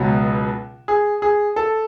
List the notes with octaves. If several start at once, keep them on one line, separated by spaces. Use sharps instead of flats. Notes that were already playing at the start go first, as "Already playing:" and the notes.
Already playing: C#2 B2 F#3
G#4
G#4
A4